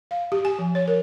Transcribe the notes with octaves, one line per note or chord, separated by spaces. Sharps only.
F5
G4
G#5
F3
C#5
A#4